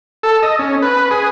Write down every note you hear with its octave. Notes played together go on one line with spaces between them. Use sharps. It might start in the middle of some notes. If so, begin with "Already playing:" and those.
A4
D#5
C#4
B4
G#4